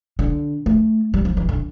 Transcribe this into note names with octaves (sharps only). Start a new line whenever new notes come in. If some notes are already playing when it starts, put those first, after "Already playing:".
D3
A3
G3
F3
E3
D3